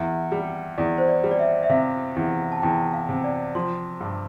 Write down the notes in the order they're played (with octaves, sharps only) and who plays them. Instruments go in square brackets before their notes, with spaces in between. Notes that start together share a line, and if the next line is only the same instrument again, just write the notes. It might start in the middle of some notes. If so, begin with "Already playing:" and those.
Already playing: [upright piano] E2 [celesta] E5
[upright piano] G3
[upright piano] E2 [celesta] D5
[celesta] C5
D5
[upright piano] G3
[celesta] D5
E5
E5
[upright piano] C3 [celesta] F5
[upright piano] E2
[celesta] A5
[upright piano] E2 [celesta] G5
[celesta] F5
[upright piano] C3
[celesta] D5
[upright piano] F3 [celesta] C6
[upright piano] G2